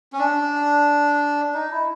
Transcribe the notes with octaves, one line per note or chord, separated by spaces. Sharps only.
C#4
D4
D#4
E4